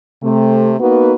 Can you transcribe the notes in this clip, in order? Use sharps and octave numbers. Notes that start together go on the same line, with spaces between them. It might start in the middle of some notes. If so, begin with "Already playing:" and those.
C3 A3
A#3 B3 D#4 F#4 B4